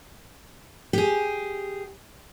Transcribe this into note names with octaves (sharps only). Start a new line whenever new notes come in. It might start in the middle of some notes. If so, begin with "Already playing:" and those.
G4 G#4